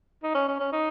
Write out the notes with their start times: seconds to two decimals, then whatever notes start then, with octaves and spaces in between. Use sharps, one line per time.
0.23 D#4
0.35 C#4
0.48 C#4
0.60 C#4
0.72 D#4